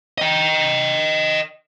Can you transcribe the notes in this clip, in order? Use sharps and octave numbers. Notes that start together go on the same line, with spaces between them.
D#5 G5